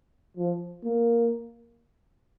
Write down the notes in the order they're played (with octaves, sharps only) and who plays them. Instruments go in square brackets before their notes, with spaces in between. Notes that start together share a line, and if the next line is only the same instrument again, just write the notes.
[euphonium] F3
A#3